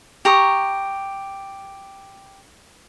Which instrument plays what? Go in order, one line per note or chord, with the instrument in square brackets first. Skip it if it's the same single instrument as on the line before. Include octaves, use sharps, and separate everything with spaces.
[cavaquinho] G4 A#5 C#6 D#6